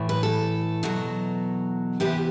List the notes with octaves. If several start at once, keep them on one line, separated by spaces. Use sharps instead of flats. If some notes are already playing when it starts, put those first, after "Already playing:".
Already playing: A2 E3 A3
B4
A4
E2 B2 F#3
E2 C3 E3 B3 G4